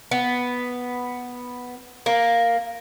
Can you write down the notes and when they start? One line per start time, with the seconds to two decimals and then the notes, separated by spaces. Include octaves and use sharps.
0.11 B3
2.06 A#3